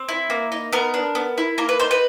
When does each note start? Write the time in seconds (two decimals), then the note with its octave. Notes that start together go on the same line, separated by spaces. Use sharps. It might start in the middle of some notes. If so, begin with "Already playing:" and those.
Already playing: C4
0.09 E4
0.30 A#3
0.52 D#4
0.72 B3 A#4
0.94 D4
1.15 B3
1.38 E4
1.58 A#3 A#4
1.69 B4
1.80 D#4 C5
1.91 B4